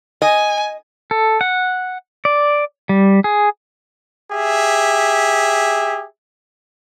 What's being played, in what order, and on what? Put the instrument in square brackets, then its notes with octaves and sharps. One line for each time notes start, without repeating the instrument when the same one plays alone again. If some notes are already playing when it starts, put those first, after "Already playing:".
[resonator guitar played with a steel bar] D#5 [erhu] G#5
[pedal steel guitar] A4
F#5
D5
G3
G#4
[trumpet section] G4 G#4 E5